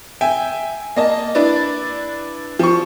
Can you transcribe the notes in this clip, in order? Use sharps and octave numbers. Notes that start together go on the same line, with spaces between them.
E5 G5 G#5
A#3 D#5 A5
D4 E4 B4 D5
F3 C#6